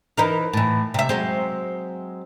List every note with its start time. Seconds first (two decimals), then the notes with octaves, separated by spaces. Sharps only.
0.17 E3 D#4 A#4
0.53 A2 E3
0.94 C3 E5
1.09 F#3 G#3 C4